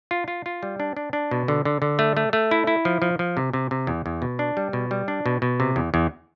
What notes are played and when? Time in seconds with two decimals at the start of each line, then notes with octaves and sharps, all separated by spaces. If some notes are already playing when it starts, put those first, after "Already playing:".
0.11 F4
0.28 F4
0.46 F4
0.63 G3
0.80 D4
0.97 D4
1.13 D4
1.31 B2
1.48 D3
1.65 D3
1.82 D3
1.99 A3
2.17 A3
2.33 A3
2.51 E4
2.67 E4
2.85 F3
3.02 F3
3.19 F3
3.37 C3
3.53 C3
3.71 C3
3.87 E2
4.06 E2
4.22 B2
4.39 D4
4.57 G3
4.73 B2
4.91 G3
5.08 D4
5.26 B2
5.42 B2
5.60 C3
5.76 E2
5.94 E2